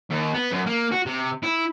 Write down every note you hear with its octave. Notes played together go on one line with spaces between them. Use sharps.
D#2
B3
F#2
A#3
F#4
C3
E4